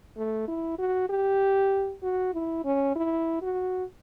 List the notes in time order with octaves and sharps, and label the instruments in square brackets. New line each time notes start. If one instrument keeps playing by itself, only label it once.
[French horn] A3
E4
F#4
G4
F#4
E4
C#4
E4
F#4